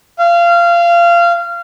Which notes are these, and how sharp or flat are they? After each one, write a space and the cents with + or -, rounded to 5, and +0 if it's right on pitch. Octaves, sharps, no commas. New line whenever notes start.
F5 -25